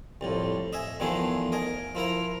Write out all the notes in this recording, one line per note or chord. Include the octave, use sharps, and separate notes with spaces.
C2 F2 A2
D#5 E5 G#5
E2 D#3 F3 A3 B3 G#4
A#4 D#5 G#5
F3 E4 A#4 A#5